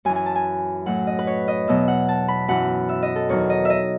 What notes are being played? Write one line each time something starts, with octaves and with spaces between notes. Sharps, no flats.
F#2 E3 G#5
G#5
A5
G#5
A2 F#3 F#5
D#5
B4
C#5
D#5
E2 B2 F#3 E5
F#5
A5
B5
F#2 E3 F#5
E5
D#5
A4
E2 D#3 F#3 C#5
D#5
D#5 E5